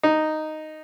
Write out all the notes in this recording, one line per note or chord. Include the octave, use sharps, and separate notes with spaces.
D#4